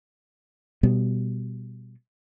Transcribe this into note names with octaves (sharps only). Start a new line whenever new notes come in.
B2 G3